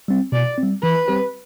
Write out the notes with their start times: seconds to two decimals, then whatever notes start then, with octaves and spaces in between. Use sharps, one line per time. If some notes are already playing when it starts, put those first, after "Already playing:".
0.08 G3 C4
0.32 B2 D5
0.58 C4
0.63 G3
0.83 E3 B4
1.08 G3 C4 G4 C5